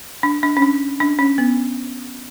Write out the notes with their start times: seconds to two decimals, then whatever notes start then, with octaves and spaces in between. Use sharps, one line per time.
0.23 D4
0.43 D4
0.57 C#4
0.62 D4
1.00 D4
1.19 C#4
1.38 B3